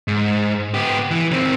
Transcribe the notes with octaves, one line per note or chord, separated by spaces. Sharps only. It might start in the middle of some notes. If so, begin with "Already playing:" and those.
G#2
B3 G4
E3
D#3 C4